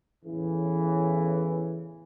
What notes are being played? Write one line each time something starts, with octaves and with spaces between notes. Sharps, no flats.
E2 A2 C#3 E3